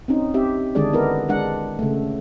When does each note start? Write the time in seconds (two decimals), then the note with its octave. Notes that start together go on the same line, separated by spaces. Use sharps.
0.08 C4 C#4 D#4
0.34 C4 G4 E5
0.75 D3 D#3 G#3 D4 G#4 D5
0.93 B3 E4 A#4
1.29 G#3 D4 F#5
1.79 C#3 A3